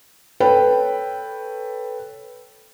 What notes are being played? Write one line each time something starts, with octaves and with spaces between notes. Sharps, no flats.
A4 B4 C#5 G5 B5